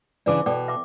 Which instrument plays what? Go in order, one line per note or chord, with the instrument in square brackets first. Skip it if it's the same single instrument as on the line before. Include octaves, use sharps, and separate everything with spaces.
[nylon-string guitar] C#3 E3 D4 [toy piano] D5 D6
[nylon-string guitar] B2 [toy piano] A4 D5 G5
[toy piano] E5 D6